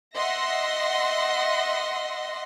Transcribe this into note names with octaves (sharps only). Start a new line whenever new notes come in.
D#5 E5 F#5 C6 A#6